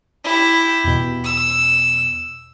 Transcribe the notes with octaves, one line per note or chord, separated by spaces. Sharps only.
E4 G4
E2 B2
E6